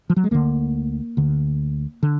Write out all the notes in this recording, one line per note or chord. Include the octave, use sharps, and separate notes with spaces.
F3
F#3
G#3
D2 D3 A#3
D2 D3
D3